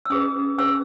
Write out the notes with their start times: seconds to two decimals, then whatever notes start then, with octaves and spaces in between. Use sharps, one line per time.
0.05 E6
0.10 C#4 G#4 B4 D#6
0.58 C#4 G#4 B4 E6